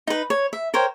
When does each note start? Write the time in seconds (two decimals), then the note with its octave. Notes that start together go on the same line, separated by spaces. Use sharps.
0.07 D#4 B4
0.30 C#5
0.53 E5
0.74 A#4 C5 C#5 G5